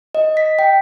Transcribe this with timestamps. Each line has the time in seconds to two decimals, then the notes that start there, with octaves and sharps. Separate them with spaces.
0.15 D#5
0.37 B6
0.59 G5